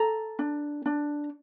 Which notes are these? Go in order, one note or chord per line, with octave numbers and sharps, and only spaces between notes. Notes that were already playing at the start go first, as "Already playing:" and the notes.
Already playing: A4 A#5
D4
D4